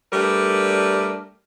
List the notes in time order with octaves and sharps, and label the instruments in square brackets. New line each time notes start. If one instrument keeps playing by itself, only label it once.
[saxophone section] G3 A3 D4 A#4 B4